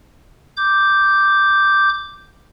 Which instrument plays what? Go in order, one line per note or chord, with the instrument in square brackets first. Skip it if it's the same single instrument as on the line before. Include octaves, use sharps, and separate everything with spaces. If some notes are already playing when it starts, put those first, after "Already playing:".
[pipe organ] D6 G6